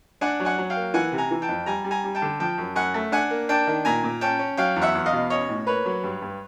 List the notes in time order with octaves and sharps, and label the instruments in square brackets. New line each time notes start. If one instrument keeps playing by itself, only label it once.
[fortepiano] D4 F#5 G#5
F#3
F#5 G#5
F#3
F5 G5
A#3
E3 F#5 G#5
C3
G#5 A#5
E3
G5 A5
F2
G3 G#5 A#5
G3
G#5 A#5
G3
G5 A5
D3
F3 G5 A5
F#2
F#2 F#5 G#5
A3
D4 F#5 G#5
A#3
D4 G5 A5
D#3
A#2 G#5 A#5
A#2
C#4 G5 A5
C#4
F#3 F5 G5
E2
E5 F#5
E2
D#5 F5
B2
C#4 C#5 D#5
A2
A#3 B4 C#5
F#3
G2
G2